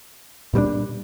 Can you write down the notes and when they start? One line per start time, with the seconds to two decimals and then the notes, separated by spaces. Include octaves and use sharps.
0.54 A#2 G3 A#3 D4